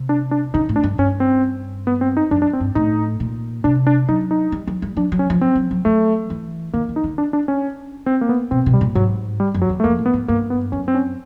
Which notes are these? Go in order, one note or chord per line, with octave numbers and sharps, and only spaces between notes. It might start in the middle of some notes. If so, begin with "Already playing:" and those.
Already playing: C3
D4
D4
C#3 D#4
A2
D4
G2
G2 C#4
C4
B3
C4
D#4
F#2 D4
D4
C4
G2
A2 D#4
A#2
C3 D4
D4
F#3 D#4
D#4
G3
F#3
G3
F#3 D4
F#3
C#4
F3
F#3 C4
F#3
F#3
F#3 A3
E3
D#3 A#3
D#3
D#4
D3
D4
D4
C#4
C4
A#3
B3
B2 C4
B2
G3
A#2
G#2 F#3
G3
F#2
F#3
E2
A3
F2 A#3
A2
B3
G#2
G2 A#3
B3
F#2 C#4
C4
C#4